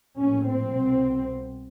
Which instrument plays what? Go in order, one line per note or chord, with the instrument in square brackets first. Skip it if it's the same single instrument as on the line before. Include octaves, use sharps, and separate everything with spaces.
[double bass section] A#1 A2 C#4
C4
C2 B2